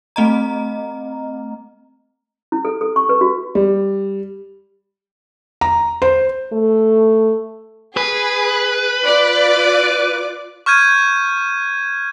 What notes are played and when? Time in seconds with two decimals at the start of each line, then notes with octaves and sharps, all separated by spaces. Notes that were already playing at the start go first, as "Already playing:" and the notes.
0.16 A3 C4 D#5 A#5
2.52 E4
2.65 A4
2.81 A4
2.96 C#6
3.09 B4
3.21 F#4
3.55 G3
5.61 A#5
6.02 C5
6.53 A3
7.97 G#4 B4
9.04 F4 D5 D6
10.66 C#6 F6 G6 G#6 D#7